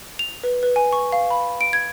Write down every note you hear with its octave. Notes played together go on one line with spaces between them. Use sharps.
F7
B4
B4
G#5
C#6
F5
B5
D7
G#6